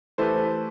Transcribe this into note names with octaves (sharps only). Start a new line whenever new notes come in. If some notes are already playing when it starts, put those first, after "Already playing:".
E3 A3 E4 G4 A4 B4 C5